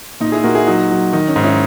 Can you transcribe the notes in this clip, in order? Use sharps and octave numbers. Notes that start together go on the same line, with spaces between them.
A#2 D#4
E4 G#4
A#2 F#4 A#4
E4 G#4
F#3 D#4 F#4
F#3
D#3 D#4
C#4
G#2
C#4 E4